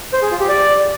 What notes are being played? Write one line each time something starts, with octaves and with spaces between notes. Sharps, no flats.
C5
G#4
F4
G4
D5